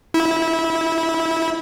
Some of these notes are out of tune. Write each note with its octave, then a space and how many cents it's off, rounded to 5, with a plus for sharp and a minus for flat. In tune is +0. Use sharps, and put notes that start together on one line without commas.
E4 -20